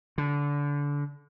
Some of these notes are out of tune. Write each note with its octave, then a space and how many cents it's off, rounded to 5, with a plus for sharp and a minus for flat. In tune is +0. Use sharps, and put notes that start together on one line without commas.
D3 -25